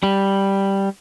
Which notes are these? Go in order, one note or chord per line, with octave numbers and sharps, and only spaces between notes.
G3